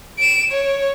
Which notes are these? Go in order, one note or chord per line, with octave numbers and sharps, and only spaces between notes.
D7 E7
C#5